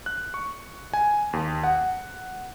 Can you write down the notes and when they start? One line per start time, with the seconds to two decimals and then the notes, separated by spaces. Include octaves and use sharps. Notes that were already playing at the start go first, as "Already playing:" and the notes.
0.06 F#6
0.34 C#6
0.94 G#5
1.33 D#2
1.64 F#5